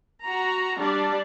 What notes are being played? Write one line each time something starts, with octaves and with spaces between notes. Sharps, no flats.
F#4 A#5
G3 D4 D5